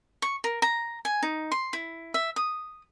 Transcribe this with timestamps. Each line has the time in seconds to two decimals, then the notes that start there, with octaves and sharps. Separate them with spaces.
0.22 C#6
0.44 A#4
0.62 A#5
1.05 G#5
1.23 D#4
1.52 C6
1.73 E4
2.14 E5
2.36 D#6